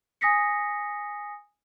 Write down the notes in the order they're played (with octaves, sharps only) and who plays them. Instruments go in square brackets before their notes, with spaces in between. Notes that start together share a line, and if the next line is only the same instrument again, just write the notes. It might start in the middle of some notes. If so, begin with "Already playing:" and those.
[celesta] G#5 D#6 A#6 B6 C#7